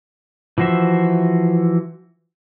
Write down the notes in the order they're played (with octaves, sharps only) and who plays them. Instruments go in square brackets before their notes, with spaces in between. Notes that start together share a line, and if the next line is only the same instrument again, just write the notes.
[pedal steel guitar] E3 F3 F#4 C5 E5